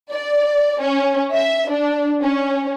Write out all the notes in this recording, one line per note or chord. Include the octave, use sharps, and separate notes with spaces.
D5
C#4
E5
D4
C#4